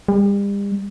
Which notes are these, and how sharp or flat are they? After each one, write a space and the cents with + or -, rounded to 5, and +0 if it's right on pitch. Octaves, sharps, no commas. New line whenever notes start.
G3 +40